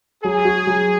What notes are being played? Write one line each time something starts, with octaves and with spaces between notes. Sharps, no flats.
F#3 G#4
F#4
F#3